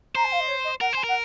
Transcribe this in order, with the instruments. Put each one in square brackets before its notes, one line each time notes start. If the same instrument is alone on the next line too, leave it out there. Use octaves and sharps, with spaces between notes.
[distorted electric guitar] C5 [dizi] A#5
[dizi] G#5
F5
D#5
C#5
D#5
[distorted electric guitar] A#4 [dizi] F#5
[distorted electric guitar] C5 [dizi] G#5
[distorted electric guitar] A#4 [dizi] F#5